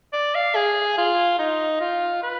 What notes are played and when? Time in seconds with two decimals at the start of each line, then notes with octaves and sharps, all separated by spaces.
0.13 D5
0.35 F5
0.55 G#4
0.98 F4
1.39 D#4
1.81 F4
2.23 B4